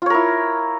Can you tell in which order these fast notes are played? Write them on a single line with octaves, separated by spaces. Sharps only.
F4 C#5 A#4 E4